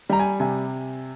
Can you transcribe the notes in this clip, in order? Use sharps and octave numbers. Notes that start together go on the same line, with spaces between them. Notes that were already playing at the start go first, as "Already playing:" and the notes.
G3 A#5
G#5
C3 G#5